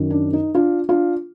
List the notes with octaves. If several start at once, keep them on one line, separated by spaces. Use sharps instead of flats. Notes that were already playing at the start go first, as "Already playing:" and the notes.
Already playing: F#2 D#3
D4
D#4
D4 F4
D4 F4